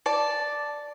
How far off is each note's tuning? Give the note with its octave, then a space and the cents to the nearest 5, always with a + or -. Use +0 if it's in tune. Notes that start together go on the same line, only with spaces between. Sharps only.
D5 +0 A5 +0